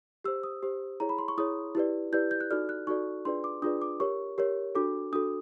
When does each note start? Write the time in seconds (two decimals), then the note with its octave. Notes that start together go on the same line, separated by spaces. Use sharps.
0.24 G4 C5 E6
0.43 D#6
0.63 G4 C5
1.00 E4 G#4 C#5 A#5
1.09 B5
1.18 C6
1.28 C#6
1.37 E4 G#4 C#5 D#6
1.75 E4 G4 B4 D5
2.13 E4 G4 B4 D5 G6
2.31 G6
2.40 F#6
2.50 D#4 F#4 A4 D5 F6
2.69 F#6
2.87 D#4 F#4 A4 D5 C#6
3.25 D4 F4 G#4 B4 D5 C6
3.44 D6
3.62 D4 F4 G#4 B4 D5 D#6
3.82 D6
4.00 G4 A#4 C#5 C#6
4.38 G4 A#4 C#5
4.75 D4 F#4 A4 D6
5.13 D4 F#4 A4 D#6